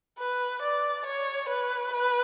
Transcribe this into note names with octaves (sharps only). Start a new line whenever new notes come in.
B4
D5
C#5
B4
B4